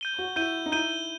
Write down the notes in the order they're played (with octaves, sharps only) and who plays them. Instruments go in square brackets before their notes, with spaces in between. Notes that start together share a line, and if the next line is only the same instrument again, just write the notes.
[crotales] G6 D#7 G7
[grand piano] F#4
[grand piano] E4 [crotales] G6 D#7 G7
[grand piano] D#4
[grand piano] E4 [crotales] G6 D#7 G7